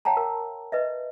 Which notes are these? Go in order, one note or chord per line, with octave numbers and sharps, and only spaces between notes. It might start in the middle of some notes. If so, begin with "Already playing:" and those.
C#5 F5 G5 A5 A#5
A#4
B4 D#5 E5